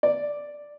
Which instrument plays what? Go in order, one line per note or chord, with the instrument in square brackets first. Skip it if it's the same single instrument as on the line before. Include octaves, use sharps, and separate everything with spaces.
[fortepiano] D5